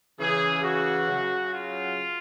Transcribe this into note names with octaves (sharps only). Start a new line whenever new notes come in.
C#3 E3 G#4
F#4
C#3 F#3
F4